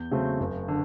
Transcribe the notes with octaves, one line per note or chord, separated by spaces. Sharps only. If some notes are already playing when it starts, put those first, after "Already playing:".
Already playing: E2 G6
C#3 F#3 A3 C4
F#1
D3